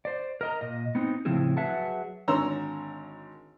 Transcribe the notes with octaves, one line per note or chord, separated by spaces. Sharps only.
C5 D5
A#4 D#5 A#5
A#2 D#5
B3 C4 D#4
A2 C#3 F3 C4 E4 G#4
F#3 G#4 B4 E5 F#5 A5
G#1 D3 C#5 A#5 C6 E6